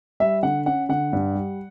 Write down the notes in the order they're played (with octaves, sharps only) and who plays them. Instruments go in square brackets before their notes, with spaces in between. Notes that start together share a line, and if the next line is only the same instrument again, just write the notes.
[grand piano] G3 E5
D3 F#5
C#4 F#5
D3 F#5
G2
G3